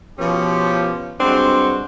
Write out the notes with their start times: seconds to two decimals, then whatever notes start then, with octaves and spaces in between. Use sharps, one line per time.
0.19 B2 F3 B3 C#4 G4
1.20 G2 G#3 C4 D4 F#4